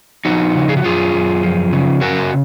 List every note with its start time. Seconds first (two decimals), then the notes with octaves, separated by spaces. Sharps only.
0.25 F3 D#4 F#4
0.55 C#3
0.69 G#4
0.77 F#4
0.84 F#2 F4 G#4
1.14 F#2
1.43 F3
1.73 C#3
2.01 F#2 F#4 A#4